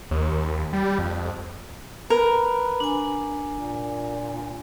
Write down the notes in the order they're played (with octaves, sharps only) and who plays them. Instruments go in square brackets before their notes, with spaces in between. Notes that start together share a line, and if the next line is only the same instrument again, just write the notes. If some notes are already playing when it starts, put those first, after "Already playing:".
[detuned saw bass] D#2
G3
F2
[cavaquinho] A#4 [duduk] B4
[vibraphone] D4 G#5
[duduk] A#2